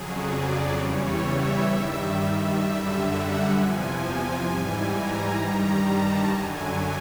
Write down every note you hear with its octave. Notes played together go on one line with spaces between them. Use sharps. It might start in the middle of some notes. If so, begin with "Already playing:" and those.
Already playing: F2 C#3 F#3 G#4
D5
E2 C#3 E3 G3 C#5
E5
G2 D#3 G3
E5
F#2 D3 G3 E5
F#5
E2 C3 F3 G#5
G#2 E3 G3
A#5
G2 D#3 G3
A5
F#2 D3 F#3 G#5